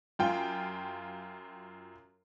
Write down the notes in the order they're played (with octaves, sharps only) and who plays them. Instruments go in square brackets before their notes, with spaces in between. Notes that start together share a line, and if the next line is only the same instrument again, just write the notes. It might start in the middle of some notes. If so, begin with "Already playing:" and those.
[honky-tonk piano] F#2 F4 G5